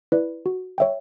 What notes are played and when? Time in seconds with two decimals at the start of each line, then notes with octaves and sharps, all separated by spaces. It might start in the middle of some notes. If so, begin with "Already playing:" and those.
0.12 E4 B4 D5
0.46 F#4
0.78 C#5 E5 G5